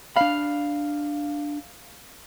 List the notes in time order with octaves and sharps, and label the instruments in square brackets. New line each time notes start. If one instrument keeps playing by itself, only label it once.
[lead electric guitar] D4 B5 [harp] F5